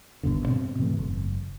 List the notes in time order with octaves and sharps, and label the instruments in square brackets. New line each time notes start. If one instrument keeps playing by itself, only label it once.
[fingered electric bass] G#1 G2 B2 D3
B2 C4
G#2 C#3 E3 A3
F#1